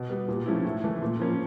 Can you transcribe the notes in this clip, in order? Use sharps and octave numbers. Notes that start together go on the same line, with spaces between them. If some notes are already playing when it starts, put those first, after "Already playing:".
Already playing: B2
G3 B3
A#2
F3 A3 C#4 E4
A2
E3 A3
A#2
F3 A#3 C#4